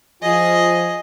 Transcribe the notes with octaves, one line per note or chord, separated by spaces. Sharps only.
F3 F4 G#4 D#5